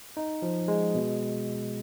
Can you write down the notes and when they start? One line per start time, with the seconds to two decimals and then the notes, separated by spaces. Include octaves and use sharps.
0.17 D#4
0.42 F3
0.68 G#3
0.95 B2